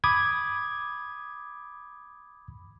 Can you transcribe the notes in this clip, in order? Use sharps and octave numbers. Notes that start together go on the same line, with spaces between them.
B5 D6 D#6 G#6